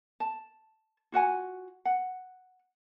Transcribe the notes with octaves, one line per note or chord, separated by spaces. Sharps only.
A5
F4 F#4 F#5 G#5
F#5